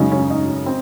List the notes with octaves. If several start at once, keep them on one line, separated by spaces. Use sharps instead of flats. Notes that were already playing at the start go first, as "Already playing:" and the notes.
Already playing: F#2 C#3 G#3 C#4 D#4
C#4
D#4
C4